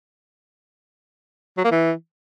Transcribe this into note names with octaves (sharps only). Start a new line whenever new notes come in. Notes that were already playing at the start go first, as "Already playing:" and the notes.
F#3
A#3
E3